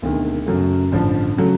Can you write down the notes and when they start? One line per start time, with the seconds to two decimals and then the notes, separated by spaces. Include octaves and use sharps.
0.02 E1 D2 C3 D#3
0.46 F#2 C#3 F#3 A3
0.92 A1 G2 D3 F3
1.37 C#3 F#3 A3